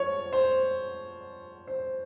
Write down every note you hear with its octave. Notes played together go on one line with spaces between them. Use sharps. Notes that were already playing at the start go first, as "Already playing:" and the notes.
Already playing: F3 C#5
C5
C5